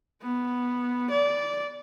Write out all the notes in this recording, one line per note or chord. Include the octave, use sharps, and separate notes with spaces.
B3
D5